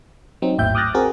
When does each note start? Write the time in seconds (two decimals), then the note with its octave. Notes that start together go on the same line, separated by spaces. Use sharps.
0.42 F#3 C4 D#4
0.58 G#1 D#2 A2 E5 G5 G6
0.75 D6 D#6 F6 F#6 A6 A#6
0.95 C4 F#4 G#4 A#4